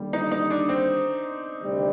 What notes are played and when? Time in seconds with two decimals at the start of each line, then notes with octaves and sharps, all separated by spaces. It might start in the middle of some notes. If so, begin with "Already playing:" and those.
Already playing: D#2 D3 G3
0.13 D#4
0.32 D#4
0.50 D4
0.69 C4
1.62 D2 C3 D#3 G3